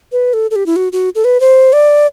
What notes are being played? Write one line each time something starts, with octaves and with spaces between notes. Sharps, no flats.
B4
A4
A4
G4
E4
F#4
F#4
A4
B4
C5
D5